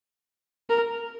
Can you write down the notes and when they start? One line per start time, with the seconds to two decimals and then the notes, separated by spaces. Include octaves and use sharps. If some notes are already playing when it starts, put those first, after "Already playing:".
0.70 A#4